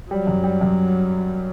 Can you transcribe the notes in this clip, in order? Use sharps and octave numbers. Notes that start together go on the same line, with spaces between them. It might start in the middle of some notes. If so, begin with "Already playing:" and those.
F#3 G3
F#2
G3
F#2